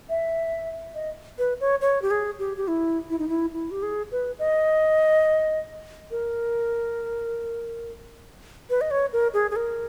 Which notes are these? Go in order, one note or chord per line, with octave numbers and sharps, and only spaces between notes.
E5
D#5
B4
C#5
C#5
G4
G#4
G4
G4
E4
E4
D#4
E4
E4
G4
G#4
B4
D#5
A#4
B4
D#5
C#5
A#4
G#4
G#4
A#4